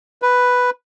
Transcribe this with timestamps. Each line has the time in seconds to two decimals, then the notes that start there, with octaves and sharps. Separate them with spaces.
0.22 B4